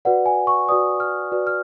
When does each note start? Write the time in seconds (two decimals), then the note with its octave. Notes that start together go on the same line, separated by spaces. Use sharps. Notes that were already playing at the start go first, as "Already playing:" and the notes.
0.05 F#4 B4 D5 F#5
0.26 G#5
0.47 C#6
0.69 F#4 B4 D5 D#6
1.00 F6
1.32 F#4 B4 D5
1.47 F6